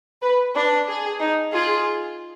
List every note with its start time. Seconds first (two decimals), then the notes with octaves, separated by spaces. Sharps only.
0.22 B4
0.55 D4 B4
0.89 G#4
1.20 D#4
1.53 F4 G#4